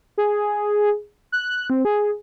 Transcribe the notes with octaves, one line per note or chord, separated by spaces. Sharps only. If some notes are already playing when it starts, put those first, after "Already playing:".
G#4
F#6
C4
G#4